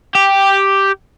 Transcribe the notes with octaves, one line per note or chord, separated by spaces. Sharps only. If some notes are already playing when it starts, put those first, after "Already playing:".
G4